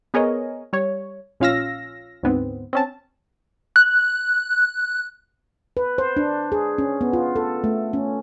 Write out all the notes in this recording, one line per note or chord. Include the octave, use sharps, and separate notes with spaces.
B3 G#4 A#4 C#5 D#5
G3 C#5
A#1 C#4 F4 F5 E6 A#6
D2 G#2 B3 C4
C4 C#4 A5
F#6
B4
C5
D4
G#4
C#4
B3
F4
A4
A3
C#4